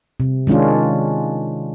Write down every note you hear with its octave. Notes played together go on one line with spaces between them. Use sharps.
C3
D#3 G#3 C#4 D4 F4